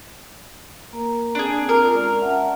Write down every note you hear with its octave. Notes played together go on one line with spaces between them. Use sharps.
A#3 A#4 A#5
C4 D4 G#4
D4 F4 A#4 D6
G#3 C#4 D5
E5 F#5 A5